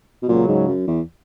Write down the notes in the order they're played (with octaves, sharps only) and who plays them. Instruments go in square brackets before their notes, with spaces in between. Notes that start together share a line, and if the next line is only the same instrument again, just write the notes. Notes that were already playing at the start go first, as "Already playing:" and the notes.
[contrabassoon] B2
[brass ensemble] C#2 C#3 F#3 [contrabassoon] A#2
[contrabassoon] G#2
F#2
E2